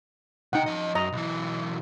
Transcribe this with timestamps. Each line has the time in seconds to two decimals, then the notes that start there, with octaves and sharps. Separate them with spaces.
0.53 C3 D#4 F#5 G5
0.66 F3 D#5
0.95 F#2 D#5 A#5
1.12 B1 E3